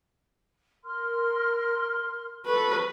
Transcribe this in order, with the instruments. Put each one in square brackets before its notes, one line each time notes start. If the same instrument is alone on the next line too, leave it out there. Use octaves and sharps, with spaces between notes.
[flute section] A#4 C6 F6
[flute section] A4 C#6 [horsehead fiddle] B4